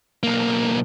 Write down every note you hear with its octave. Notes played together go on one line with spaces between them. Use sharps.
B1 A#3